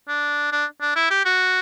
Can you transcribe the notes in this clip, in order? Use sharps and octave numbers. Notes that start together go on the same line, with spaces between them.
D4
D4
D4
E4
G4
F#4